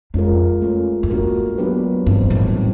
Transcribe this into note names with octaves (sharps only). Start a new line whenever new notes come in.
F2 G#3 C#4 F4 A#4
A3 C#4 F4
F2
F#2 A#3 D4 F#4 A#4
F#3 B3 D4 G4 B4
G2 E3 G3 C4 D#4
A2
A#2 G3 C4